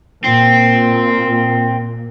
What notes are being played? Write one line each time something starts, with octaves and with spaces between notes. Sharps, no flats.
A#2 C4